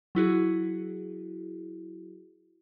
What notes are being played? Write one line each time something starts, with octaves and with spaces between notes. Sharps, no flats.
F#3 E4 F#4 G#4